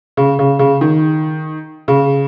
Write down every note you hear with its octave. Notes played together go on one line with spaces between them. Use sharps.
C#3
C#3
C#3
D#3
C#3